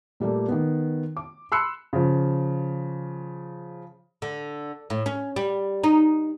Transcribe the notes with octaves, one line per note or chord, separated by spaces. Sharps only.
A#2 G3 A3 A#3
D#3 B3
D6
B5 C6 E6 F#6 C7 C#7
C#3 F3
D3
A2
C#4
G3
D#4